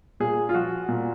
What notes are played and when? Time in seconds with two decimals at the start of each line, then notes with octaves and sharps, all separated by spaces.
0.20 A#2 G#4
0.49 F4
0.54 F3 F#4
0.88 A#2